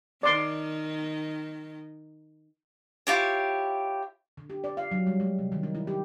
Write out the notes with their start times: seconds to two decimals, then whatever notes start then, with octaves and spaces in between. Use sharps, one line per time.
0.23 D#3 D5 C6
3.07 E4 F4 G4 C#5
4.37 D3
4.50 G4
4.64 D5
4.77 F5
4.91 F#3
5.07 G3
5.20 G#3
5.39 C3
5.52 D#3
5.63 D#4
5.75 E4
5.87 G4